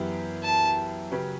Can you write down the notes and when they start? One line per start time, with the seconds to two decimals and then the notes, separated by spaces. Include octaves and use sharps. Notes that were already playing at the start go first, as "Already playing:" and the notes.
Already playing: F#2 E3 B3 E4 G4
0.43 A5
1.11 C#3 F#3 C#4 G4 B4